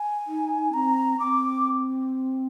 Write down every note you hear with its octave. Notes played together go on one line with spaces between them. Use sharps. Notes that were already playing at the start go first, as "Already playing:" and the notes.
Already playing: G#5
D#4
C4 A#5
C4 D6